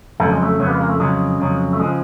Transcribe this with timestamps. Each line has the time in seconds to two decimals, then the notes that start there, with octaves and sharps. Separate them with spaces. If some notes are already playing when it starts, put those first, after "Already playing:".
0.20 F2 C#3 F#3 A3
0.32 G#3
0.43 A3
0.59 F2 C#3 F#3 A3
0.66 B3
0.69 G#3 A#3
0.80 G#3 A#3
0.89 A3
1.00 F2 C#3 F#3 G#3
1.40 F2 C#3 F#3
1.73 A3
1.80 C#3 F3 G#3